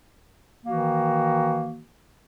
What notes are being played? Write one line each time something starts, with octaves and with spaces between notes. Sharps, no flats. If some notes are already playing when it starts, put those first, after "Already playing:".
D#3 E3 A#3 F#4